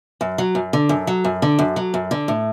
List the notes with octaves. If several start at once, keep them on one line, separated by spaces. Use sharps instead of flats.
F#2
F#3
F#2
D3
F#2
F#3
F#2
D3
F#2
F#3
F#2
D3
A2